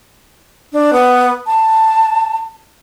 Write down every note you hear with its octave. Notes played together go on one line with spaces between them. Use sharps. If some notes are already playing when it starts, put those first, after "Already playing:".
D4
B3
A5